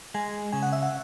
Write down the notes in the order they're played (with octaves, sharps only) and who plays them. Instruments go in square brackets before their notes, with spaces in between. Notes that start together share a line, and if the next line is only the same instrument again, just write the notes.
[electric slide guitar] G#3 [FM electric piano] G#5
[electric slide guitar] C#3 [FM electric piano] G#5
[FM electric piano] F#5
E5
F#5